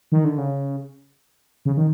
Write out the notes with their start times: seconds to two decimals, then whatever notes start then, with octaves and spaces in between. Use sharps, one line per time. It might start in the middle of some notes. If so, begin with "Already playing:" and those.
0.12 D#3
0.24 D3
0.38 C#3
1.65 C#3
1.77 D#3